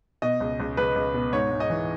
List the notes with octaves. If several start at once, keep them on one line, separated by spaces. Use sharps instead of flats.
B2 D#5
C#2
C#2
C#2 B4
C#2
B2
G#2 C#5
G#2
D#5
E3